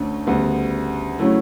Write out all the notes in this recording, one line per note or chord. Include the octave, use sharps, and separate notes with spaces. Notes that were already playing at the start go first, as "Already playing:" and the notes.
Already playing: D2 D3 A3 C#4
D2 C#3 G3 B3
C#3 F#3 A3 E4